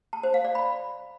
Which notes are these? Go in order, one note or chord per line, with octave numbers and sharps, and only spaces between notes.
A5
C5
F5
D5
B5